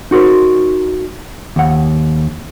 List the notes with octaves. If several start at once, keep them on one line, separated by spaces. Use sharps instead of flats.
D#4 F#4 A#4 C5
D#2 F#5